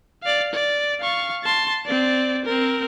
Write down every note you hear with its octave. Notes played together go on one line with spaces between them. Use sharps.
D5 F5
D5
F5 C#6
A5 C6
C4 D5
C4 A#4